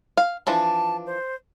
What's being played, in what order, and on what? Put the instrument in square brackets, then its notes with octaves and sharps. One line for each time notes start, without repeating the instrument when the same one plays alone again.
[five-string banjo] F5
[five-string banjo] E3 F3 D4 [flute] A5
[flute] C5